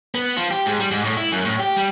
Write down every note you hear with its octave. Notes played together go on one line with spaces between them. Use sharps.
B3
F3
G4
G#2
G3
G#2
A2
E4
F#2
A2
G4
G3